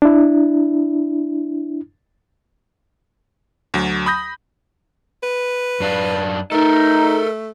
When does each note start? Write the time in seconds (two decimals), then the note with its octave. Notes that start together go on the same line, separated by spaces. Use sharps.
0.02 D4 E4
3.74 D2 F#3
4.06 B5 D#6 G6 A#6
5.23 B4
5.80 F#2 D4 F5
6.52 A3 D#4 A4 A#4